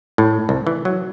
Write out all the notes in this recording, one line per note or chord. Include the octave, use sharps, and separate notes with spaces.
A2
C2
E3
F#3